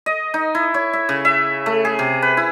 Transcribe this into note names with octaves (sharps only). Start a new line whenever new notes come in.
D#5
D#4
E4
C#5
E5
C#3
E5
A3
G#4
C3
B4
E4